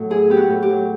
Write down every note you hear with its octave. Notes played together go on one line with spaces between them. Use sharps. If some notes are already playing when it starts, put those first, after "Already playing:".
Already playing: A2 F#3
E4 G#4
B3 G4
F#4
A2
G4
F#3